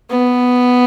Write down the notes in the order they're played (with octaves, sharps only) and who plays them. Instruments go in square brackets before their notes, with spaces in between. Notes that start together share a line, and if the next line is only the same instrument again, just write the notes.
[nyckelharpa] B3